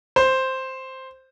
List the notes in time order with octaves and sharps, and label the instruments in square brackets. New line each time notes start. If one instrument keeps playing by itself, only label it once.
[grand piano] C5